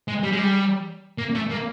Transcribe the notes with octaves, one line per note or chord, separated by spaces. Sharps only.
G#3
G3
G#3
G3
A#3
A3
A#3